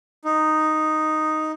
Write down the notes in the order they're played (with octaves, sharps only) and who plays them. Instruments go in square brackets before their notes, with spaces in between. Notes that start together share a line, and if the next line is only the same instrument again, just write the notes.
[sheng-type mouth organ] D#4